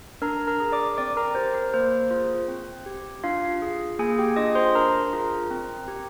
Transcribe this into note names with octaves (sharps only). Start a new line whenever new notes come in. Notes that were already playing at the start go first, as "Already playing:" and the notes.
D4 A#4 A#5
A#4 A#5
G#4
D5 D6
C4 D5 D6
A#4 A#5
G4 C5
A#4
A#3 C5
F4 G#4
C4
G4
D4 F4 F5
G#4
A#3 G#4 G#5
G4 G5
D4 F4 G#4 D#5 D#6
C5 C6
D4 A#4 A#5
F4 G#4
C4
G4